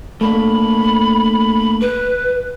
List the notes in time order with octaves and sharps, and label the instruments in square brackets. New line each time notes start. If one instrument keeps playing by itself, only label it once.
[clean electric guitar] A3 A#3 D4 [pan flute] B5
[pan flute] B4